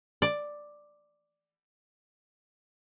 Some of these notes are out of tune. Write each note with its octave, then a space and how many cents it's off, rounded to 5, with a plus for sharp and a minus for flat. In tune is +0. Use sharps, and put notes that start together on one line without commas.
D5 +5